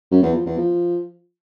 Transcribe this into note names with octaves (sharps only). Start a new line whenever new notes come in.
F#2
E2
F3
E2
F3